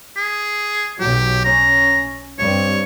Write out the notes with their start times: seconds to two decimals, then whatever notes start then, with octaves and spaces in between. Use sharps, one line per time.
0.17 G#4
1.00 B1 F#3 G4
1.45 C#4 A#5
2.39 G2 C4 C#5